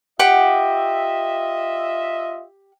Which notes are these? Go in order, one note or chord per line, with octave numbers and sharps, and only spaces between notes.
F4 G4 D#5 E5 F#5